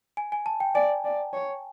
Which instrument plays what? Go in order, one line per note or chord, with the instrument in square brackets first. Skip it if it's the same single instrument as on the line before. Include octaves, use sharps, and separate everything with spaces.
[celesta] G#5
G#5
A5
G5
[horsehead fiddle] D5 [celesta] G#5
[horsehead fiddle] D5
C#5